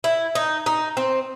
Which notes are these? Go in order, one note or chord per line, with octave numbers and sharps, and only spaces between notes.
E4
D#4
D#4
C4